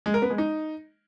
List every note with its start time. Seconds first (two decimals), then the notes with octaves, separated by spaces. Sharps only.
0.06 G#3
0.14 A#4
0.22 B3
0.30 G#3
0.38 D#4